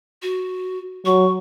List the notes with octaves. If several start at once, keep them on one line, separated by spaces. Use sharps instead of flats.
F#4
F#3 C#6